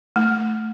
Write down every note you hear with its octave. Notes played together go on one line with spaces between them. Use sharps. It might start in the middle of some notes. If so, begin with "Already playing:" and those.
A3